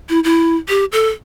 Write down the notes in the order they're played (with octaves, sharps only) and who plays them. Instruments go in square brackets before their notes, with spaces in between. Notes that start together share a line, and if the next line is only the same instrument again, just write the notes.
[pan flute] E4
E4
G4
A4